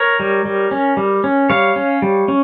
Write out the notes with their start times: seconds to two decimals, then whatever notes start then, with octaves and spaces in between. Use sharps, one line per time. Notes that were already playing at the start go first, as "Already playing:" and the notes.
Already playing: A#4 C#5
0.20 G3
0.45 G3
0.71 C#4
0.97 G3
1.24 C#4
1.50 G3 C#5 F5
1.76 C#4
2.02 G3
2.28 C#4